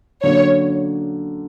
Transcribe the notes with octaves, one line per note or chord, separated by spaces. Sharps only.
D3 F#3 A#3 C#4 C#5